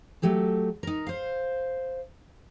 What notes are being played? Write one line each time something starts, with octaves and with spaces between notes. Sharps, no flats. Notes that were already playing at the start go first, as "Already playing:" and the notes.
F#3 A3 G4 A4
D#4 A#4
C5 F5